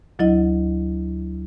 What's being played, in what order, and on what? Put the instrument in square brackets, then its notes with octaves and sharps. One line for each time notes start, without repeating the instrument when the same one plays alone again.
[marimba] D2 F#3 E4 D#5